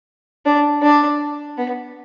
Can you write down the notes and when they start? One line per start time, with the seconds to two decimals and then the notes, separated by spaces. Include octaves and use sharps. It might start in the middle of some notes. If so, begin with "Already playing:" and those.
0.45 D4
0.83 D4
1.57 B3